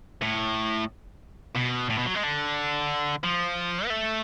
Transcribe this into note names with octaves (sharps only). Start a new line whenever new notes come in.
A2
B2
A2
B2
F#3
G#3
D3
F3
B3
A3